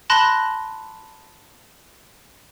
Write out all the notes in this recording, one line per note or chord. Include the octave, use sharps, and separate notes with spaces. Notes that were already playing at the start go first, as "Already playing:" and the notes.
A5 B5 C6 F#6 A#6